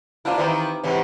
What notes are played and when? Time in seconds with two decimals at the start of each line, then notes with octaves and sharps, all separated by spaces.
0.25 C3 A#3 D4 E4 F4
0.38 D#3 E3 C4 D#4 E4 G4
0.84 G#2 C3 E3